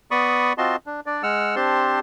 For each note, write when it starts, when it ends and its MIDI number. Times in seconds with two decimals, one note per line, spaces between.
0.11 0.53 59
0.11 0.53 74
0.11 0.53 83
0.11 0.53 85
0.11 0.53 87
0.58 0.76 60
0.58 0.76 65
0.58 0.76 66
0.58 0.76 75
0.58 0.76 81
0.58 0.76 84
0.86 1.00 62
1.06 1.23 62
1.06 1.23 74
1.23 1.55 56
1.23 1.55 78
1.23 1.55 88
1.23 1.55 89
1.56 2.00 60
1.56 2.00 62
1.56 2.00 67
1.56 2.00 72
1.56 2.00 81
1.56 2.00 84